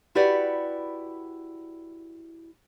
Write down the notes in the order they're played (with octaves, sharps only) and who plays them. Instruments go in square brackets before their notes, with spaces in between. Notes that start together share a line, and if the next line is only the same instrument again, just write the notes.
[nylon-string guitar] E4 F#4 G4 B4 D5 F#5